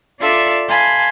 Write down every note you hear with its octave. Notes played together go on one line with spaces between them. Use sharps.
D4 F4 A4 D5 E5
F5 G#5 A5 B5 C6